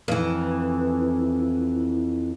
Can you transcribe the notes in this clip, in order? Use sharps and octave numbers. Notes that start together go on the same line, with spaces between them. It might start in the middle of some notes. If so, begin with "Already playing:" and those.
F2 E3